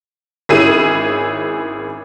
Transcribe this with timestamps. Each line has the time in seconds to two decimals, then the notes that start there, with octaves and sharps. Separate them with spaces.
0.49 G#1 C#4 E4 G#4 E6 D#7